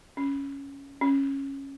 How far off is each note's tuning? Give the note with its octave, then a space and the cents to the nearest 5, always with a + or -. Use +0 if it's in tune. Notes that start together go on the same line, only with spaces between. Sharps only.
C#4 +5
C#4 -10